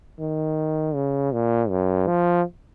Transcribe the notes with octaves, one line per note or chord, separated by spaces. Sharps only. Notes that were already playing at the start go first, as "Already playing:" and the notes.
D#3
C#3
A#2
F#2
F3